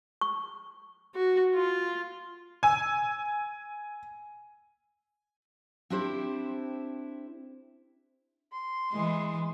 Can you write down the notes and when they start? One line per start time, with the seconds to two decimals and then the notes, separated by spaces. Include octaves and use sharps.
0.21 C#6
1.15 F#4
1.55 F4
2.63 G#5 E6
5.90 C4 D4 E4 G4 C5
8.52 C6
8.92 E3 G#3